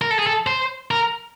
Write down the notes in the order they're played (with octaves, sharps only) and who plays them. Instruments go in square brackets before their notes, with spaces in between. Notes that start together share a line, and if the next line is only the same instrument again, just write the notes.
[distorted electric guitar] A#4
A4
G#4
A4
C5
A#4